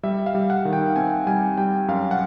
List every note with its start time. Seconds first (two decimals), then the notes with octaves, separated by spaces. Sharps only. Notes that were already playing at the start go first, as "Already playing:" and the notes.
0.03 G3 E5
0.26 F5
0.35 G3
0.50 F#5
0.65 D#3
0.73 G5
0.96 C4 G#5
1.27 G3 G#5
1.58 G3 G5
1.88 F#2 F5
2.11 F#5